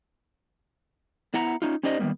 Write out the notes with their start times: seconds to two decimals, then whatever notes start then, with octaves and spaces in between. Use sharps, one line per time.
1.34 B3 E4 F#5 A#5
1.62 C#4 D#4 F4
1.83 C#4 D#4 G4 C5 D5 D#5
1.99 D#3 F3 G3 A#3 B3